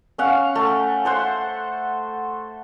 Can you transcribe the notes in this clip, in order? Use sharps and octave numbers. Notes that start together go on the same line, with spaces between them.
C#4 F5 F#5
A3
A4 C5 F#5